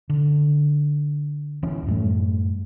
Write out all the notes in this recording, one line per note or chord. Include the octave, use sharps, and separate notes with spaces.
D3
D1 E3 C#4
F#2 A2 G3 A3